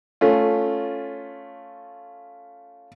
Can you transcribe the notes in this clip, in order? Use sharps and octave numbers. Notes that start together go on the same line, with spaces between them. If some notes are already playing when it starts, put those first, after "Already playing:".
A3 C#4 F4